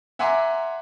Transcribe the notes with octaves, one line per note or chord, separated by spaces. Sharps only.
E5 F#5 G#5 A#5 C6 D6